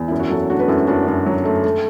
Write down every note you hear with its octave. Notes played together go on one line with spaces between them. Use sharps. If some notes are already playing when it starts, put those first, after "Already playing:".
Already playing: E2
F#2 E4
F#4
F#3 E4 A4
A3 D4 F#4
B4
F#2 E4 A4
F#2 D4 F#4
F#2
F#3
A3
A3